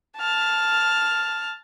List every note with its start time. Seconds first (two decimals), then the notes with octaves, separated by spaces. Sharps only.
0.17 A5 F6